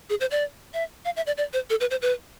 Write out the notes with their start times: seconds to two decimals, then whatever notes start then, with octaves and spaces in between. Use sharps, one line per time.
0.10 G#4
0.20 C5
0.31 D5
0.74 E5
1.05 F5
1.16 E5
1.27 D5
1.38 D5
1.53 C5
1.70 A4
1.81 B4
1.91 C5
2.02 B4